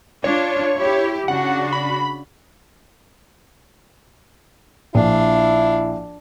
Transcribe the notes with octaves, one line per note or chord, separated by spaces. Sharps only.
D4 F4 C#5
E4 G4
C#3 D4 F#4 F#5
B5
A#1 F3 D4 E4 F5